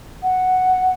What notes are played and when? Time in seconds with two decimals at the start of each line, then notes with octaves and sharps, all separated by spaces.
0.23 F#5